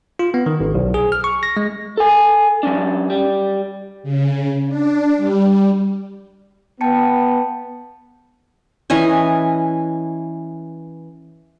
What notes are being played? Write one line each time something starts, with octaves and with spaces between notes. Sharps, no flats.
F4
B3
D#3
G#1
B1
G#4
F6
C#6
A#6
G#3
A4 G#5
F#3 C#4 D4
G3
C#3
D4
G3
B3 G5 A5 C#7
E3 C#4 D#5 G#5